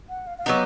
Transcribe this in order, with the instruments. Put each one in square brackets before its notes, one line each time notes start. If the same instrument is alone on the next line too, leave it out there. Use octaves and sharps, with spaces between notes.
[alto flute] F#5
F5
F5
[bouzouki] F#3 B3 D#4 G4 [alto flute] F#5